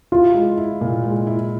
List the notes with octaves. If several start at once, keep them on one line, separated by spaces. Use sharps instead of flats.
E4 F4
G#3
E4
A#2
G#3
E4